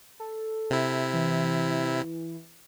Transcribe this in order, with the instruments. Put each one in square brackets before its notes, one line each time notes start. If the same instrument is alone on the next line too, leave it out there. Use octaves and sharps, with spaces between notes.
[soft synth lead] A4
[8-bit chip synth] C3 E4
[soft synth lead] E3